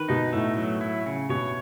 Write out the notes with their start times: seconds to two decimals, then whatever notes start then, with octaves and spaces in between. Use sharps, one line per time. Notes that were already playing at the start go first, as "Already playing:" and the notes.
Already playing: D#3 B4
0.09 B2 D#4
0.33 A2 A3
0.57 F#3
0.81 E4
1.06 C#3
1.29 B2 C#5